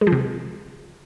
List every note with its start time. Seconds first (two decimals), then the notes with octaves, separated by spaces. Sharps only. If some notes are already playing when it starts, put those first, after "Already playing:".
0.01 G#3
0.07 F3
0.12 C3